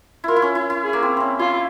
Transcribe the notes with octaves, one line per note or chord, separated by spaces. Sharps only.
E4 F4 A#4
E4
C#4
E4
E4
G#4
A#3
C4
C4 C#4
E4 F4